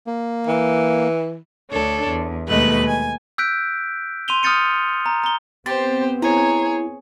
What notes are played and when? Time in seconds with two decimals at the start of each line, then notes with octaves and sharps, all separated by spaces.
0.07 A#3
0.47 E3
1.71 D2 D4 A4 C#5
2.08 E2
2.47 D#2 B2 G#3 A3 B4 F#6
2.87 G#5
3.38 E6 F#6 G6 B6 D7
4.28 C6 D#7 F7 G7
4.43 D#6 F6 G6 A6 C#7 D#7
5.06 A#5
5.24 A#5 G7
5.66 B3 C4 G4 C5 C6 A6
6.22 E4 G#4 C#5 A#5